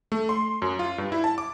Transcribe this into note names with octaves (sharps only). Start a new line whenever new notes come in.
A3
C6
F#2
F4
G2
E4
A5
D6